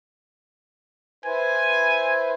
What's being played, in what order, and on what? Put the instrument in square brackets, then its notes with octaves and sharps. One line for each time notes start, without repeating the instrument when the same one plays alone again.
[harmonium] E4 B4 C5 [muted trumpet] G#5